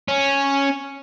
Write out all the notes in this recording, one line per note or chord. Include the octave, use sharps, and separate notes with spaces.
C#4